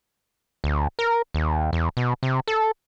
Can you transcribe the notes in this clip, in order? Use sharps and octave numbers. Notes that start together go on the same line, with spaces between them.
D2
A#4
D#2
E2
B2
C3
A4